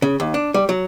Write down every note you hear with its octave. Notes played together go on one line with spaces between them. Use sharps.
C#3
D#2
D4
G3
F#3